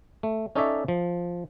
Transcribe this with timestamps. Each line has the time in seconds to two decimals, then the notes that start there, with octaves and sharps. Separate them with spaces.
0.23 A3
0.55 C#4 D#4 A4 C#5 D5 E5
0.88 F3